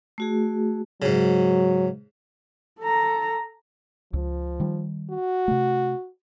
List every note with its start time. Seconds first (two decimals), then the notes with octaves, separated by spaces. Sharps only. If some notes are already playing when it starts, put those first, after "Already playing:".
0.18 A3 F#4 G#4
1.02 G#2 C#3 F#3
2.80 A4 A#5
4.13 C#2 F3
4.60 D#3 G3
5.11 F#4
5.48 C3 A3